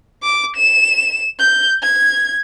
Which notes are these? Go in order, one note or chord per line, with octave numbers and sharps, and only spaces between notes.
D6
E7
G6
G#6